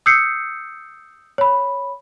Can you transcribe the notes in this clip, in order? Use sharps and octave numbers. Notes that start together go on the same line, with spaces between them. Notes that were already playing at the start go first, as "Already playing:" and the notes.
D#6 E6 G6 C7 C#7
C#5 B5